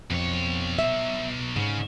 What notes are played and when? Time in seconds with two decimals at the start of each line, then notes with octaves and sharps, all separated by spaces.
0.11 F2 B2 C#5
0.79 E5
1.56 G#2 C#3 C#4